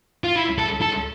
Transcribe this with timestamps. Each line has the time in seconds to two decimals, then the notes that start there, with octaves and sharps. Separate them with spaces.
0.24 F4
0.36 E4
0.58 A4
0.82 A4